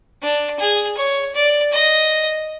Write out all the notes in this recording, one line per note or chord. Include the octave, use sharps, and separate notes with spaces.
D4
G#4
C#5
D5
D#5